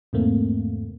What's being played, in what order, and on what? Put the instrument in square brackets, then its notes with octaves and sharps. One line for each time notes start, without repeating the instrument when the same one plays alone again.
[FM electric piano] E2 G#2 C3 A3 A#3 C4